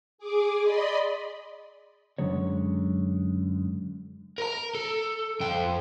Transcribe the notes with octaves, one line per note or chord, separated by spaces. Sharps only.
G#4 D6
D5 D#5 B5 C6
F#2 D3 F#3 G#3 C#5
A#4 A#5
A4
F2 G5